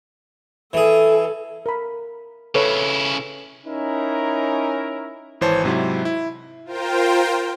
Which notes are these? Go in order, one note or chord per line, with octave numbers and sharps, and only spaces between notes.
E3 G#4 A4
A#4 B5
C#3 E4 A4 B4 C#5
C#4 D#4 E4 A#4
G#1 E3 C5 C#5 A5
G#2 C3 F#3 E4
E4
F4 A#4 C5 G5